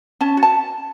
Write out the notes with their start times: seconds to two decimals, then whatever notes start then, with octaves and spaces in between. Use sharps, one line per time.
0.21 C#4 A5
0.37 F#4
0.43 A5